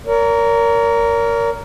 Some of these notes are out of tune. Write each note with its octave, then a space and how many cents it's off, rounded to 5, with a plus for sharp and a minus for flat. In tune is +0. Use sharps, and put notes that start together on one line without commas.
A#4 +0 C#5 +45